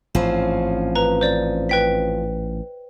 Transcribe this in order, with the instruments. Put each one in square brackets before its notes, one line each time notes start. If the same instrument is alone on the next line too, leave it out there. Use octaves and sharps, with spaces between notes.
[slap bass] A1 G#2 [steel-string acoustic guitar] F3 C4 C#4
[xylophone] B4 A#5
C5 D5
B4 G5 B6